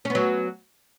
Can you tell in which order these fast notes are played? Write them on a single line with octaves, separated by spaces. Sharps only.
C#4 B3 F#3